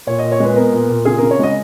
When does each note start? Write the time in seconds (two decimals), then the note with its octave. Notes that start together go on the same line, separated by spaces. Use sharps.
0.07 A#2 C#5
0.19 A#2 D#5
0.32 C#5
0.40 G#3 B4
0.56 B3 A#4
0.72 A#2
0.89 A#2
1.05 C#3 G#4
1.18 C#3 A#4
1.31 C#5
1.39 G#3 D#5